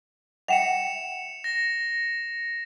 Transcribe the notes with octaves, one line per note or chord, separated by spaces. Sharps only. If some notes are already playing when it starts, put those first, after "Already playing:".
E5 F#5 G5 C#7 E7 F7
A#6